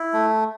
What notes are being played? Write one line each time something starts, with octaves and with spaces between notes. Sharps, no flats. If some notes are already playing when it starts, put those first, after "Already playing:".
Already playing: E4
A3